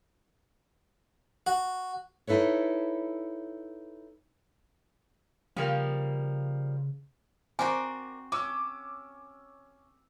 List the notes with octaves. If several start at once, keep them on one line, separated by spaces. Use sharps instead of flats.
F#4
D#4 E4 A4 B4 C#5
C#3 F3 G3 A#3
C4 F#4 A#4 D5 G#5
C#4 D6 E6